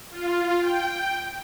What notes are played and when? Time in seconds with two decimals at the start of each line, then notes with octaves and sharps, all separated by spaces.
0.10 F4
0.60 G5